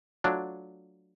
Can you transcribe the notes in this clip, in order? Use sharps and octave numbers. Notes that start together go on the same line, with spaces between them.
F#3 A3 D4 F4